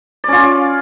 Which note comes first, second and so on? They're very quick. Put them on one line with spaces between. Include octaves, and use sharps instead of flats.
D5 C#4 F4